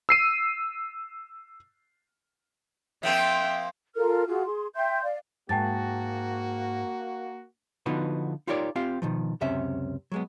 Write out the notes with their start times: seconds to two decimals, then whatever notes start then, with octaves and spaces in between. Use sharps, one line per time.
0.09 E6 C7 D#7
3.03 F3 A#3 C4 E5 G5
3.95 F4 A4 A#4 F6
4.27 F4 F#4 G#4
4.45 G#4 C6
4.75 E5 G5 C6 G6
5.03 D5 F5
5.49 G#2 A#3 F#4 G5 A5 A6
7.86 D3 F3 B3 D#4 F#4 B4
8.47 D#4 F4 G4 A#4 C#5 D5
8.76 C4 F4 G4 F5
9.02 B2 D#3 F3
9.41 C#2 F#2 C3 C#4 E5
10.12 F#3 G#3 B3